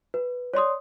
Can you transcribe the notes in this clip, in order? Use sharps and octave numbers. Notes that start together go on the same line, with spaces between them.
B4
C#5 D5 C6 D#6